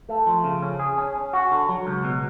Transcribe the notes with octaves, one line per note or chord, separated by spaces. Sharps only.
A3
F3
C#3
C#4
G#4
C#4
C#4
F#4
D3
F#3
C#2
B2